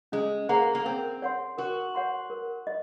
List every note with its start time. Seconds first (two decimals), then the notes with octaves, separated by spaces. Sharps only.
0.12 G#3 C#4
0.49 A#3 G#4 C5 F#5 A#5
0.75 A#3
0.85 C4 A#4
1.22 C#5 F#5 C6
1.58 F#4 A#4
1.95 C#5 F#5 C6
2.30 A#4
2.67 D#5